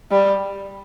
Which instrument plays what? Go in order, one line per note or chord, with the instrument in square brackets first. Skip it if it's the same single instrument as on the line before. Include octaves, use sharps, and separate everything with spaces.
[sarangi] G3